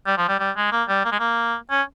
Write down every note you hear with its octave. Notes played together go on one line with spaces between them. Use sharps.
G3
F3
G3
G3
G#3
A#3
G3
A#3
G#3
A#3
C#4